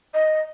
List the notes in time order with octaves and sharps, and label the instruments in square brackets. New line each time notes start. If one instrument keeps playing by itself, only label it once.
[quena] D#5